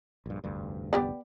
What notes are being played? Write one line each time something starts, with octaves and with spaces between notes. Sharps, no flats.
A#1 G2
F1 D2 G2
B3 G4 D5